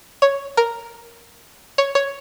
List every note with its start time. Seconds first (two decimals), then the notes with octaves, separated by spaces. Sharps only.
0.22 C#5
0.57 A#4
1.78 C#5
1.95 C#5